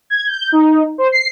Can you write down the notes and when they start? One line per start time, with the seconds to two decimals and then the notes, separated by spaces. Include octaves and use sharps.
0.10 G#6
0.27 G6
0.52 D#4
0.98 C5
1.12 C7